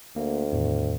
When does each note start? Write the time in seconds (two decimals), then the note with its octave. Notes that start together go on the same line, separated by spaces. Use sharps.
0.16 D2 A#3
0.52 E2 A2 D#3